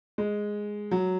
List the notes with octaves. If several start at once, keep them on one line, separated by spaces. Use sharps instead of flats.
G#3
F#3